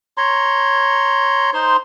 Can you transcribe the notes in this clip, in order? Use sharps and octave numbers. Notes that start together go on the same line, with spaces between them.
C#5 A#5 C6
D#4 C5 C6